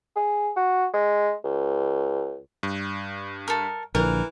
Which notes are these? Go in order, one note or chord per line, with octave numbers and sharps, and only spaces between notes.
G#4
F#4
G#3
C#2
G2
A4 A#4
A#1 D3 E3 F3 A#4